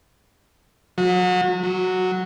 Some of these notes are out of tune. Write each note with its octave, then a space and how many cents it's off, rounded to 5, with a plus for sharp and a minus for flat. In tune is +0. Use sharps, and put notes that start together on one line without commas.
F#3 -35
F#3 -5